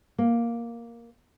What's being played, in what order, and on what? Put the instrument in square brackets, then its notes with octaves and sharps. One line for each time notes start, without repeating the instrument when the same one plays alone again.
[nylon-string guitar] A#3